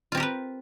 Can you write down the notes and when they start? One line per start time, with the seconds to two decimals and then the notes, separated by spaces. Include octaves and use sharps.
0.12 F4
0.15 C4
0.17 G4
0.20 A#4
0.23 B4